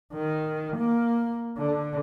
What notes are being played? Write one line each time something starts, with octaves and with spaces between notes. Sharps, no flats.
D#3
A#3
D3